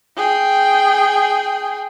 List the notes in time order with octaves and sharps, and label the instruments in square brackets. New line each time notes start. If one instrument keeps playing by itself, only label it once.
[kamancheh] G#4 G5